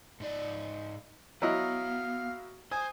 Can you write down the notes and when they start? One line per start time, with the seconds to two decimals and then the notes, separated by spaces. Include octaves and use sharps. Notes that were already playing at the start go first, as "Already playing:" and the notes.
0.20 G#2 D#4 D5
1.42 F#3 B3 E4 D#5 F5
2.71 C5 G#5 D#6